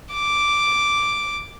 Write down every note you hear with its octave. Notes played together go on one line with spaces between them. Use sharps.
D6